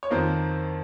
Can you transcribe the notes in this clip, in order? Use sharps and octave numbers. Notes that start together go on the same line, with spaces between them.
C#5
F2 D#3 A#3 C5